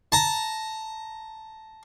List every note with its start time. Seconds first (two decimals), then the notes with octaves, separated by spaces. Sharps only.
0.12 A5 A#5